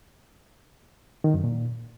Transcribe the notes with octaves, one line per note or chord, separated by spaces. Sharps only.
D#3
F#2
A#2